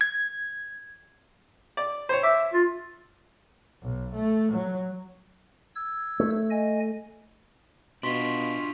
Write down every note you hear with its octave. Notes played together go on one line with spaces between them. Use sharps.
G#6
D5
C5 C#5
E5 D6
F4
B1
A3
F#3
E6 G#6
A3
D#5 G#5
B2 D4 F4 C6 C#6 B6